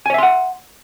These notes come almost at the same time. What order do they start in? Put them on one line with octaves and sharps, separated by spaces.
G#5 C#5 E5 C6 F#5